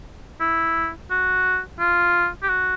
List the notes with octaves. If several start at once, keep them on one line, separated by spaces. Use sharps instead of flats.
E4
F#4
F4
G4
F#4